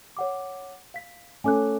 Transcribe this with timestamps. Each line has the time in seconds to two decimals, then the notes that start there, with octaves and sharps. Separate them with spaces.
0.17 C#5 F#5 D6
0.94 F5 B6
1.44 A3 C#4 A4 G#5 D6 F#6